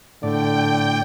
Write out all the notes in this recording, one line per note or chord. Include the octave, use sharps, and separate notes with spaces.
A2 D3 D5 G5